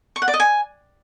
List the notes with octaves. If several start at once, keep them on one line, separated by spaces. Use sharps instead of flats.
C#6
F#5
D5
D#5
G#5